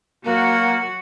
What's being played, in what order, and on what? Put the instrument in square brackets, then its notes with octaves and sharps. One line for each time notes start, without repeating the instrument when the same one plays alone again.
[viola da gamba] F#3 F#4 [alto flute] A#3